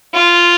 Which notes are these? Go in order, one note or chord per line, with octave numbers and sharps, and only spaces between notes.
F4